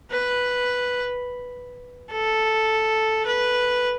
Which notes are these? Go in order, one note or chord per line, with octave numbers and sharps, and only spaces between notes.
B4
A4
B4